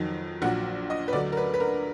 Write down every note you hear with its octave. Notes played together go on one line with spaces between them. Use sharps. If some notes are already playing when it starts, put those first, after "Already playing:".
Already playing: F2 D#3 F#3
A#1 A#2 F#3 F#5
D#5
B4
D2 D3 F#3 D5
A#4
B4
B4
A#4